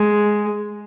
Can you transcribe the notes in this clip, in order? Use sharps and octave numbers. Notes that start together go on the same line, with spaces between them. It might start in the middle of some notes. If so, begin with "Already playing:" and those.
Already playing: G#3